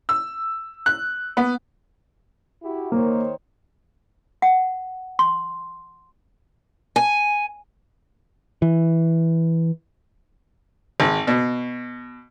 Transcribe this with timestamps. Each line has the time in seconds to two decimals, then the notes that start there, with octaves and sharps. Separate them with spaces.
0.09 E6
0.86 F#6
1.37 B3
2.63 E4 F#4 G4
2.92 D#3 A#3 C5 C#5
4.42 F#5
5.19 C6
6.96 G#5
8.62 E3
11.00 G#1
11.27 B2